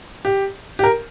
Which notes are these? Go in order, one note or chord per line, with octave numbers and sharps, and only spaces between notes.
G4
G4
A#4